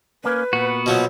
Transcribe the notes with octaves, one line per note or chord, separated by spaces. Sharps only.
A#3 C#4 B4
A#2 B3 F#4
B2 F3 F#3